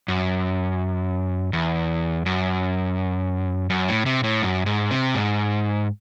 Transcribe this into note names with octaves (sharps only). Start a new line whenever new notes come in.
F#2
E2
F#2
F#2
A2
C3
A2
F#2
G#2
C3
G#2